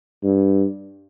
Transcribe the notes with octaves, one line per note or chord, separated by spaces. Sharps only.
G2